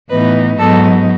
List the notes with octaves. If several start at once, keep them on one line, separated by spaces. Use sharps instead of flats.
A2 E3 B3 D#4 B4
G#2 F#3 B3 D#4 A4